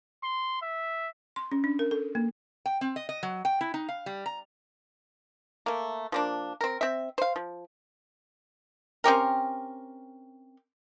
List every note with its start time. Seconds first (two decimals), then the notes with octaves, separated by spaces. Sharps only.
0.23 C6
0.62 E5
1.36 C6
1.52 C#4
1.64 D4
1.79 A#4
1.91 A4
2.15 A#3
2.66 G5
2.81 C4
2.96 D#5
3.09 D#5
3.23 F#3
3.45 G5
3.61 E4
3.74 D#4
3.89 F5
4.06 G3
4.26 A#5
5.66 A3 A#3
6.12 F3 A#3 D4
6.61 C4 A#4
6.81 C4 E5
7.18 C5 F5
7.36 F3
9.04 C4 C#4 G4 A#4